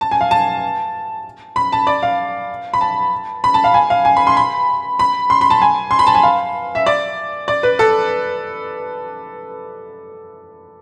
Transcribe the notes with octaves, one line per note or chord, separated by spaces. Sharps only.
A5
G#5
F5
A5
B5
A5
D5
F5
B5
A5
B5
A5
F5
G#5
F5
G#5
B5
C6
B5
B5
C6
B5
A5
G#5
C6
B5
A5
G#5
F5
E5
D5
D5
B4
A4